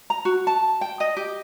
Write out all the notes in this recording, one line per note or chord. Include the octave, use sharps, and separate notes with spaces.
A#5
F#4
A5
G5
D#5
G4